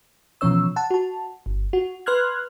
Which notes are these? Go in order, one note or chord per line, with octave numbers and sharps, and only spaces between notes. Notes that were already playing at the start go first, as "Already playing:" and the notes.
B2 E3 F3 C#4 C#5 E6
F#5 A5
F#4 A5
G1
F#4
B4 C6 F6 F#6 G#6